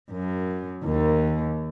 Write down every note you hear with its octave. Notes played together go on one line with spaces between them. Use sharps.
F#2
D#2